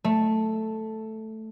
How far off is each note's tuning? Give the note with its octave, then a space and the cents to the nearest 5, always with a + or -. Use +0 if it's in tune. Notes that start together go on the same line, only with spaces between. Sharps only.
A3 +0